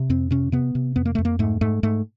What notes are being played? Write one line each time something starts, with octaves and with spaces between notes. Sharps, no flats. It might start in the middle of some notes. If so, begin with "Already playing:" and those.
Already playing: C3
F2 C4
C3 C#4
C3 B3
C3
F2 B3
A#3
F2 A3
A#3
G#2 A3
G#2 A3
G#2 A3